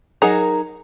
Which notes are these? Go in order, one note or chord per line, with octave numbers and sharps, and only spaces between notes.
F#3 D#4 G#4 A#4 A#5